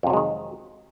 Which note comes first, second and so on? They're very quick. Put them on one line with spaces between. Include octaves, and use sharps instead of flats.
F2 C3 F#3 G#3 D#3